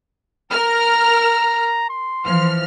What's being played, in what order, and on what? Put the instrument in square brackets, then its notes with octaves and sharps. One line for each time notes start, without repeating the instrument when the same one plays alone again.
[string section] A#4 F6 [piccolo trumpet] A#5
[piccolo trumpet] C6
[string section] E3 F3 F6